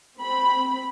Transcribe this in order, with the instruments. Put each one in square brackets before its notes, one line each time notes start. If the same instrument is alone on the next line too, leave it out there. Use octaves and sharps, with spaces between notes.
[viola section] C4 B5